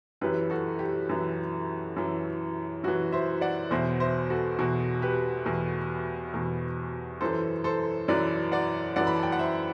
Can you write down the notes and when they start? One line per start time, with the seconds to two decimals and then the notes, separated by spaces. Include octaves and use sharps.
0.21 F#2 E3 G4 B4
0.50 F#4 A4
0.79 G4
1.09 F#2 E3
1.96 F#2 E3
2.84 F#2 E3 F#4
3.12 C5 E5
3.41 D5 F#5
3.71 E2 B2 C5 E5
4.00 C5 E5
4.30 F#4 A4
4.59 E2 B2 F#4
5.02 G4 B4
5.46 E2 B2
6.34 E2 B2
7.21 F#2 E3 A4 C5
7.64 A4 C5
8.08 F#2 E3 B4 D5
8.52 D5 F#5
8.96 F#2 E3 D5 F#5
9.07 B5
9.15 A5
9.23 G5
9.32 F#5
9.39 C5 E5